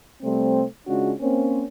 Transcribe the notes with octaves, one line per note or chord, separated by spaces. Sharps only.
C3 G3 A3 C4
C#3 G#3 C#4 D4 F4 F#4
A#3 C4 C#4